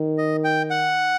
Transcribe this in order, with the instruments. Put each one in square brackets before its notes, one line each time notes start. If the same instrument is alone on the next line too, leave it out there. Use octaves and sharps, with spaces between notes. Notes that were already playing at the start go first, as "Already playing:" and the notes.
Already playing: [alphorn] D#3
[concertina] D#5
G5
F#5